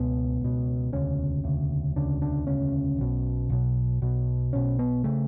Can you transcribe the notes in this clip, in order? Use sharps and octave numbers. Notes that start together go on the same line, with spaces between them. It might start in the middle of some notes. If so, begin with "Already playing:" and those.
Already playing: C#2 B2 B3
C#2 B2
E1 D2 C#3 C#4
E1 D2 C#3
E1 D2 C#3 D4
D4
E1 D2 C#3 C#4
B1 B2
B1 B2
B1 B2
B1 B2 C#4
B3
C#3 A3